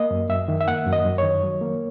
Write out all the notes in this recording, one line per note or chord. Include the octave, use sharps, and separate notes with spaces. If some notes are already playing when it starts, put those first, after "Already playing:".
Already playing: A#3 D#5
F#2
F#2 E5
D#3
E5
A#3 F#5
F#2
D#5
F#2
C#5
D#3
F#3
A#3